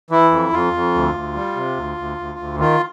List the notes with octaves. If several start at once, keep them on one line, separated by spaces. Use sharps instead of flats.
E3 E4
F2
F2 F4
F2
D2
D2
G3
C3
D2
D2
D2
D2
D#3 F4